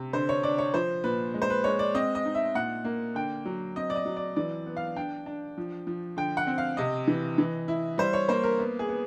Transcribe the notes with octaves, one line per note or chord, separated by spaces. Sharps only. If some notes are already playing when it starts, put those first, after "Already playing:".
Already playing: C3
D3 C5
C#5
D4 D5
C#5
F3 C5
A#2 B4
G#3
C5
B4
G#3 C#5
D5
C4 D#5
D#5
D#4
E5
A#2 F#5
A#3
D3 G5
F#3
C4 D#5
D5
D#5
F#3
D5
E3 D5
B3
F5
D4 G5
D4
F3
F3
D3 G5
F#5
C4
F5
C3 D#5
E3
E3
E4
G3 C5
C#5
A#3 C5
A#4
B3
G#4
B3